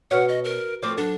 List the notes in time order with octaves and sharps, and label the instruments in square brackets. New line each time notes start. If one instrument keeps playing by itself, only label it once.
[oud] B2 C#5 [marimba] F#4 B4 F6 [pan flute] F#5
[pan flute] D#5
A#4
[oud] F3 A3 C4 [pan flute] D6
[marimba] F#3 [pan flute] D4 [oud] A4